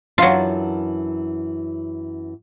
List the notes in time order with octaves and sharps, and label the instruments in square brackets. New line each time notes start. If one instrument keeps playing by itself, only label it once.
[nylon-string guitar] F#2 E3 D4 [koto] F#3 F4